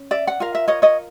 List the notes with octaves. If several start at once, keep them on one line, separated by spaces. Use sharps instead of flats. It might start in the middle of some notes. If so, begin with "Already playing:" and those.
Already playing: C#4
D5 E5
F#5
F4 A#4 F5
E5
C#5 D#5
C#5 D#5